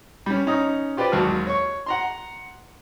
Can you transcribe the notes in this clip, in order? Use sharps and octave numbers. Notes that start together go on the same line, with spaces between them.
G3 C#4
C#4 D#4 A#5 D#6
F4 G4 B4 C5 D5
G#1 D#2 F#3 F#4 A5 F6
C#5 C#6
F#5 A#5 C6